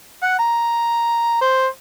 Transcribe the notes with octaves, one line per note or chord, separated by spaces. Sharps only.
F#5
A#5
C5